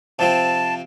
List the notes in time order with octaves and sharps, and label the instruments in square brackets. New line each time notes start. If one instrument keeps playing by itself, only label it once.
[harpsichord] C3 F3 C4 [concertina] A5